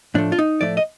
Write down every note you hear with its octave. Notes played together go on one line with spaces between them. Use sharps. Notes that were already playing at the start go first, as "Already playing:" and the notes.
A2 F3 A3 D4
F4
D#4
A2 F3 A3 D5
D#5